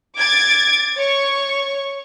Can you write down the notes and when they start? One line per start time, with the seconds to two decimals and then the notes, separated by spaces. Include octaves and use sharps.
0.17 D6 G#6 A6
0.96 C#5 C#6